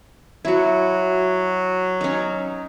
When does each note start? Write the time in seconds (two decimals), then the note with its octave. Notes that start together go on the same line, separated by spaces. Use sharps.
0.45 F#3 E4 F#4
2.01 C#4 D#4